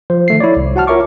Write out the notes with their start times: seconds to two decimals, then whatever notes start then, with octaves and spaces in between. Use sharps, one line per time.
0.10 F3 C5
0.28 D#3 A3 C7
0.40 E4 C#5 D5
0.57 C2
0.76 F#4 F#5 A5 F6
0.87 F4 A#4 C#5 E5 C#6 D6